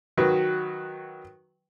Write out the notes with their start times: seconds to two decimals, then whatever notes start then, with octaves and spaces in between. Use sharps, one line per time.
0.17 D#3 F#3 F#4 B4